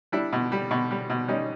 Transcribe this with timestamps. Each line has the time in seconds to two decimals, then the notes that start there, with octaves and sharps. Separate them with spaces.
0.12 G3 D4 E4
0.33 B2
0.52 G3
0.71 B2
0.91 G3
1.10 B2
1.28 G3 C#4 D#4